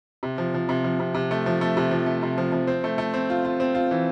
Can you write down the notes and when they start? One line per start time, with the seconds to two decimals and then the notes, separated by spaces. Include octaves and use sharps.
0.23 C3
0.38 F3
0.54 F3
0.69 C3
0.84 F3
1.00 C3
1.14 C3
1.31 A3
1.46 F3
1.61 A3
1.77 C3
1.91 F3
2.06 A3
2.23 C3
2.38 F3
2.52 F3
2.67 C4
2.84 A3
2.98 A3
3.14 C4
3.30 F4
3.45 F4
3.60 C4
3.75 F4
3.91 E3